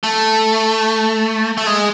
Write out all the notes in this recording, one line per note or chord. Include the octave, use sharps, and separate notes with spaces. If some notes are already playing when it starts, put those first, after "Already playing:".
A3
A3
G#3